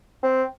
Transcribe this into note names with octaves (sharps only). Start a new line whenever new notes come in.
C4